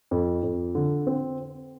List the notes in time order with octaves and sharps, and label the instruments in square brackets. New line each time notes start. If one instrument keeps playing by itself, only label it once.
[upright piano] F2
F2
D3
C4